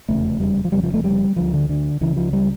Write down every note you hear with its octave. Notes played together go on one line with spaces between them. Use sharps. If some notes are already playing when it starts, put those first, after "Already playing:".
F1 E2 C#3 A3
G3
F3
F1 F2 C#3 G3
F3
A3
G3
D2 D3 F3
D3
D3
C#2 C#3 E3
F3
G3